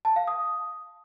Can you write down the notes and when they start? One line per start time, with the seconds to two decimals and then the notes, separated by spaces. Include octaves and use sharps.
0.05 A5
0.16 F5
0.28 D#6